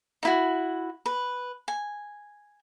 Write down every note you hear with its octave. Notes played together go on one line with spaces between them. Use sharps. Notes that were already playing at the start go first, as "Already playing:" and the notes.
D#4 E4 F#4
B4
G#5